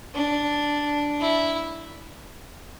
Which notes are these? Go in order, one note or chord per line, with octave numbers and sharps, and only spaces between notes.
D4
E4